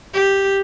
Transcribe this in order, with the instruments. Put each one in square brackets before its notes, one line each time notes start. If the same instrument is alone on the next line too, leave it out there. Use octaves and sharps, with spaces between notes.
[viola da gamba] G4